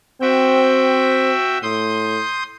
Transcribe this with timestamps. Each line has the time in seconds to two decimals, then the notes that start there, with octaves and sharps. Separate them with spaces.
0.21 C4 F#4 E5 G5
1.63 A2 C6 D#6 G6